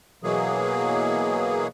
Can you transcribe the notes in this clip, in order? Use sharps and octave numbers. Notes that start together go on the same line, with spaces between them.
B2 E3 F#3 A#3 G#4